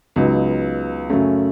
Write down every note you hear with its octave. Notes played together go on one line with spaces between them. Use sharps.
C#2 C#3 F#3 B3 D#4
F#2 C#3 F#3 A3 C#4